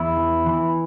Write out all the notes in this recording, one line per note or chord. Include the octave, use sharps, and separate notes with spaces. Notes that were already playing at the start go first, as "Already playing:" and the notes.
Already playing: E2 E4
E3
E3